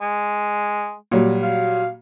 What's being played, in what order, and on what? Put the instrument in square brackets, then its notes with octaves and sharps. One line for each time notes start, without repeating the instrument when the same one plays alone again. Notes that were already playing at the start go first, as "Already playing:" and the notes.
[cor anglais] G#3
[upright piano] A#2 F#3 G3
[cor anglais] F5